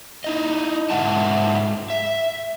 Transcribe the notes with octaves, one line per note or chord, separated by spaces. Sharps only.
D#4 E4 D#5
G#2 G#3 E5 F#5 A5
E5